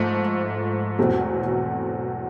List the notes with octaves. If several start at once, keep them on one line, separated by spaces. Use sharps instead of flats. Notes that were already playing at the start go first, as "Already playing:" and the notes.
Already playing: G#2 F3 A3
E2 B2 F#3 A3 C4